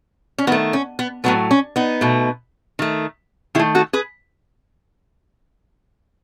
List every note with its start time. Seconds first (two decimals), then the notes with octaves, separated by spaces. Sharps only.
0.38 C#4
0.47 D#3 B3
0.52 A3
0.73 C#4
0.99 B3
1.24 A2 F#3 A3 B3
1.51 C#4
1.76 B3 D#4
2.01 B2 A3
2.79 D#3 A3
3.55 D#3 E4 G#4
3.59 A3
3.75 F#4 A4
3.93 G#4 B4